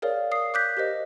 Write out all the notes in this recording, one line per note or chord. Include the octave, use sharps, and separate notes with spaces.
G#4 A#4 C#5 D5 F5
D#6 C7
D6 F#6 G6 B6
G4 A#4 C5 D#5